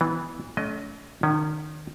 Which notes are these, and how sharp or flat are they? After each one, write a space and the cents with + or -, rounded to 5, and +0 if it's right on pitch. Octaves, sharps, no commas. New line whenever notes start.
E3 -15 B3 +0
A3 -30 C#4 +40 D#5 +0
D#3 -30 C#4 +10